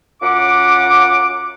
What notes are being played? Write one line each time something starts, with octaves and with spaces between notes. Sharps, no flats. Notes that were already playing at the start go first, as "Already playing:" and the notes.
F#2 F4 F#5 D6